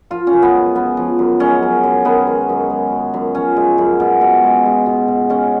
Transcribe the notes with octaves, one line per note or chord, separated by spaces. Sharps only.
F3 F4
C#4
F#2
B3
G#3
C#3 B3
F3
F#2
G#3 C#4
F#2
F#2
D#3 B3
G#3
F#2
G#3
F#2
F#2
F3 C#4
G#3
F#2
B2
B2
G#3
G#3
B2
B2
G#3 C#4